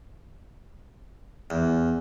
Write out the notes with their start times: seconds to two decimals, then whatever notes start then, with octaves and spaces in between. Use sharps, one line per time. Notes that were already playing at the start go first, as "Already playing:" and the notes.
1.50 E2